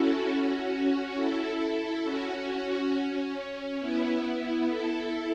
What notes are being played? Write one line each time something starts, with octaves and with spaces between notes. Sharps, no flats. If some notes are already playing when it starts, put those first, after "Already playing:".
Already playing: C#4 E4 F#4 A4
C#4 F#4
E4 A4
E4 A4
C#4 F#4
C#4
B3 E4
B3 E4
E4 A4